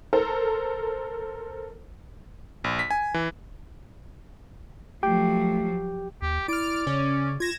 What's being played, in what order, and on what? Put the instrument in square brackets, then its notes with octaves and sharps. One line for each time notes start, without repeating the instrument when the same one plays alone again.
[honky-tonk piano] A4 A#4 C5
[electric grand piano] A#1
B6
G#5
E3
[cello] F3 F#3 [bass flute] A3 [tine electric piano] G4 G5
[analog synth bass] D#2 [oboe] G4
[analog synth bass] E4 [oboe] D5 [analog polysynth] F6 D7
[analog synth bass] C#3 [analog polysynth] C#4
[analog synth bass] F4 [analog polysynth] G#6 A#6 E7